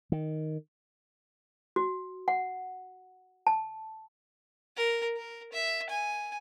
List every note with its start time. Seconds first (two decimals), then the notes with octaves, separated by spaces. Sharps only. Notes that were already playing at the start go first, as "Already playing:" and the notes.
0.12 D#3
1.76 F#4
2.28 F#5
3.47 A5
4.76 A#4
5.16 A#4
5.52 E5
5.90 G#5